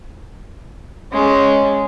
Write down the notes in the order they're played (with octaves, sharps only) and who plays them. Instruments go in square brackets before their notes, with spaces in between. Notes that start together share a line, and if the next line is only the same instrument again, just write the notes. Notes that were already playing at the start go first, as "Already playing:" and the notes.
[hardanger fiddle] G#3 C#4